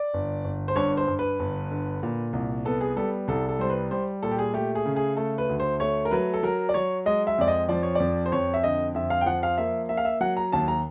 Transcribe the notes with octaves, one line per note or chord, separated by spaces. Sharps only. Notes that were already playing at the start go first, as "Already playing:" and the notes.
Already playing: D5
G1
G1
C5
G2 C#5
C5
G2
B4
G1
D3
A#2
C2
B3 A4
G#4
G3 A4
C2 A4
A4
G3 C5
B4
G3 C5
A#2 A4
G4
G#4
A3 G4
G#4
C#3
G#4
A3 A4
B4
D2
C5
A3 C#5
A#4
F#3 B4
A4
F#3 A#4
D5
F#3 C#5
G#3 D#5
E5
F2 D5
D#5
F3 D5
C#5
F2 D5
C5
F2 C#5
E5
D3 D#5
F2 E5
F5
G5
F3 F#5
F5
A#3 E5
A#3 E5
F5
E5
F#3 F#5
A#5
D#2 A5
A#5